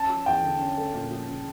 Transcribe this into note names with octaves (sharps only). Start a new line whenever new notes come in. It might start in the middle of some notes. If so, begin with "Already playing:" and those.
Already playing: C#4 A5
F3
E2 G5
D3
C#4
A3
A#2
F3
C#3